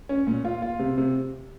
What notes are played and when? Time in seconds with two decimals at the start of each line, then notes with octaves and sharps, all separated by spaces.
0.09 C#4
0.27 A#2
0.45 F4
0.62 F4
0.79 C3
0.98 C3